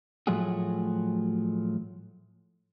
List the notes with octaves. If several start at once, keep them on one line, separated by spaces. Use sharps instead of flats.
A2 F3 F#3 A3 F#4 G#4